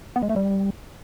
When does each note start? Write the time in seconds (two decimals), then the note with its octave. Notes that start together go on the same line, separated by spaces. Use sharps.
0.16 B3
0.23 G#3
0.29 A3
0.36 G3